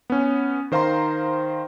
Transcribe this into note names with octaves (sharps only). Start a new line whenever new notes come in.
B3 C#4
D#3 C5 F5 A#5 C6